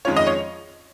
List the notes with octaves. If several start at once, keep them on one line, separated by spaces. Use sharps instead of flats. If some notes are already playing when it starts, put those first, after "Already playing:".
F2 D#3 G#3 C#4 F4 C#5
D#5
C#5